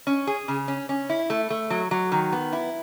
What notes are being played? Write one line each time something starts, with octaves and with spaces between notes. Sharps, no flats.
C#4
G#4
C#3
C#4
C#4
E4
A3
A3
F#3
F#3
D#3
B3
E4